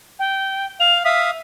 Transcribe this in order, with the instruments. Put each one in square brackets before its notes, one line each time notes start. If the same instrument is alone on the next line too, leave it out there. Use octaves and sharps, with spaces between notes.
[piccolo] G5
[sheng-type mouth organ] F5 [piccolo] F7
[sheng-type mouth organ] E5 F5 D#6 [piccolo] B6